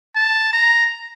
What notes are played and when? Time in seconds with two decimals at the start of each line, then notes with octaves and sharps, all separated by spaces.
0.16 A5
0.53 A#5